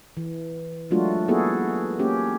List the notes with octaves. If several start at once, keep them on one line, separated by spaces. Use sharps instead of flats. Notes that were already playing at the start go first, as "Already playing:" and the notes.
E3
F#3 G#3 A3 D4 F4 F#4
A#3 B3 E4 F#4 G#4 A4
A#3 C#4 G4